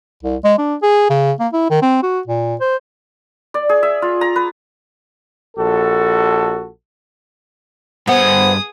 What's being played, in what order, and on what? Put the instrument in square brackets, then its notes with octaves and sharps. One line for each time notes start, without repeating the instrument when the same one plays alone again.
[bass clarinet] C2
G#3
D4
G#4
C#3
A#3
E4
D#3
C4
F#4
A#2
C5
[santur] D5
G#4
E5
F4
A#5
B4
[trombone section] A#1 F#4 A4
[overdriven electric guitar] G2 F#5 [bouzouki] B3 [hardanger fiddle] G#4 D#6 [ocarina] C5